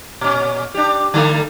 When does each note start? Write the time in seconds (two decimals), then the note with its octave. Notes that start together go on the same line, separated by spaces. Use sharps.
0.21 A#2 C#4
0.74 D4 G4
1.14 D3 G3 A3